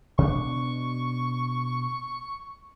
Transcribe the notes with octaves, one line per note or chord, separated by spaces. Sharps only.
B2 D4 C#6